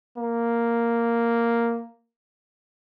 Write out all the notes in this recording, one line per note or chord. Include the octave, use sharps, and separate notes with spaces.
A#3